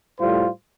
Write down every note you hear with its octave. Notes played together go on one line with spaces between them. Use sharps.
A2 G3 F4 C5